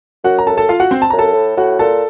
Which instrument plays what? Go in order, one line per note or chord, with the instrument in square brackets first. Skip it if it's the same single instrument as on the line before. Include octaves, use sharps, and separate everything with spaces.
[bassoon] F#2 [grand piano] F#4 F#5
[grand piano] A#5
A4 A5
A4 A5
F4 F5
F#4 F#5
C4 C5
A5
[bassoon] F#2 [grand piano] A#5
[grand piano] A4 A5
[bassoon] A2
[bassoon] A2 [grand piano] F#4 F#5
[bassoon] A#2 [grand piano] A4 A5